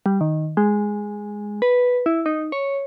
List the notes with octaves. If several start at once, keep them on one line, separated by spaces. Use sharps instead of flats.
G3
D#3
G#3
B4
E4
D#4
C#5